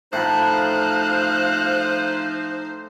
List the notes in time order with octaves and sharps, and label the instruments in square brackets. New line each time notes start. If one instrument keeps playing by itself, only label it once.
[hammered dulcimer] A2 B5 [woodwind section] F3 D#4 [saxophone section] C5 [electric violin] F5 F#6